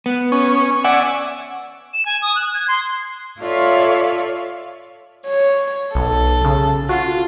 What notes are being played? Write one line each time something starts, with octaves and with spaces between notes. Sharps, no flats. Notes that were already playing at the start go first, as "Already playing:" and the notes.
B3
C#4
D5 E5 F#5 G#5
E7
G#5
D#6
F#6
G#6
C6
F4 A4 C#5 D5 E5 F5
C#5
B1 A4
C#3
F4 F#4